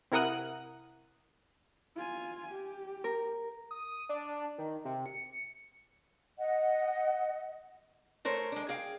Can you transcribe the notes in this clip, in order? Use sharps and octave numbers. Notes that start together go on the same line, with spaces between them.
C3 E4 A#4 F#5 D#6 F#6
F4 G#5
G4
A#4
D#6
D4
D#3
C3
C#7
D#5 F#5
A3 A#4 C5 C#5
G#3 D4
G#4 F5 G5